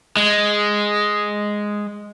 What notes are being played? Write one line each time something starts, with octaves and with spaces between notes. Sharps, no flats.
G#3